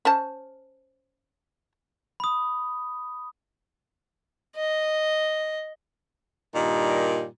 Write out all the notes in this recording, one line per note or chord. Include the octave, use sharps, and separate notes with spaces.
C#4 C5 A5
B5 D#6
D#5
G2 A#2 D#3 G3 D#4